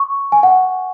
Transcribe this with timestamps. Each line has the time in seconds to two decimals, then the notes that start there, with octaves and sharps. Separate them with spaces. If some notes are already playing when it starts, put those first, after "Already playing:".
Already playing: C#6
0.32 G#5
0.43 F#5